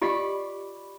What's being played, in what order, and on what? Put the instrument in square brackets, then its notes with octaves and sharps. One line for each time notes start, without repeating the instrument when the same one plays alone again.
[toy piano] F4 G4 D#5 [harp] D5 B5 C#6